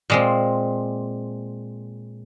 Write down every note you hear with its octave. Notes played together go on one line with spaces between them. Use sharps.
A#2 G#3 C4